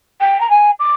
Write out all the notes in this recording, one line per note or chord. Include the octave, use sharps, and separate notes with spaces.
G5
A#5
G#5
D6